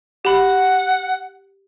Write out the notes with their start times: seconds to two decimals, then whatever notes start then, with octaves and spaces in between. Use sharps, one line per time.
0.25 G4 F#5 B5